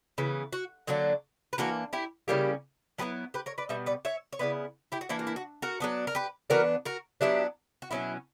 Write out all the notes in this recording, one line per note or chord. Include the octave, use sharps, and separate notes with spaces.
C#3 E3 B3
F#4
D3 F#3 A#3 D4 F#4
B4
E3 A#3 D4 F#4 A#4
E4 G4
C#3 G3 A#3 C#4 E4 G4
F#3 B3 E4 G4 B4
G4 B4
A#4 C#5
B4 D5
B2 G3 B3 E5
B4 D5
C#5 E5
C#5
C#3 E3 B3 E4 B4 D5
E4 G4
F#4
E3 A#3 D4 E4
F#4
E4
F#4
F#4 A#4
F#3 B3 D4
A#4
G4 B4
E3 B3 D4 F#4 A#4
F#4 A#4
F#3 B3 D4 E4 G4
F#4
B2 F#3 C#4 E4